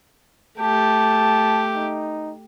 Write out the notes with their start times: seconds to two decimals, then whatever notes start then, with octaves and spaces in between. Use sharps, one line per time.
0.60 A3 G4 A5
1.75 D#4